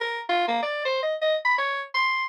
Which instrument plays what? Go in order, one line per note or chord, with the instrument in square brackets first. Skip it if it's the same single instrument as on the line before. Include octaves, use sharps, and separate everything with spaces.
[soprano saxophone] A#4
F4
A#3
D5
C5
D#5
D#5
B5
C#5
C6